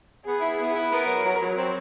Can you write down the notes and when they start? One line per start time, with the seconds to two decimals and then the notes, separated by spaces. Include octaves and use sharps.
0.24 B3 G#4
0.40 E4
0.58 B3
0.74 E4
0.90 B3 A#4
1.07 F#3
1.24 F#3
1.40 F#3
1.56 C4